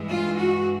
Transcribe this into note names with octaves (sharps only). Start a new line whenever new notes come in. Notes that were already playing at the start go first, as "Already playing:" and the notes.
Already playing: G2 E3 G#3
F4
F#4